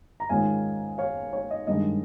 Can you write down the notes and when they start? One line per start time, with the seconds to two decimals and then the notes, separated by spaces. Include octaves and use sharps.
0.20 A#5
0.29 G#2 D#3 G#3 C#4 F4 F5 G#5
0.98 C#5 F5
1.33 C#5
1.51 D#5
1.67 G2 D#3 G#3 D#5